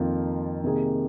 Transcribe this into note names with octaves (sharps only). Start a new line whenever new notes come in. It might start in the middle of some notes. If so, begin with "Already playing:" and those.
Already playing: F2 D#3 A#3 F4
C3 D#3 A#3 G#4